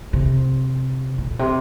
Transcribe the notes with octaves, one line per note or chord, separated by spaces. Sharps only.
C3
A#2
C3